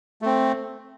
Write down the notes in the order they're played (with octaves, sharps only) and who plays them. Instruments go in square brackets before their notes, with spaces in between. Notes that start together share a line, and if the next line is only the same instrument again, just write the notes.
[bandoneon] A3 C4